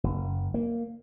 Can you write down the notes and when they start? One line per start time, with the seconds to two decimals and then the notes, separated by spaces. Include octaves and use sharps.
0.04 F#1
0.54 A#3